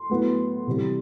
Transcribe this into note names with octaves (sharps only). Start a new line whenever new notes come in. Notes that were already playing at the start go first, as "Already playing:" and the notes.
Already playing: C6
A2 F#3 B3
C3 E3 G3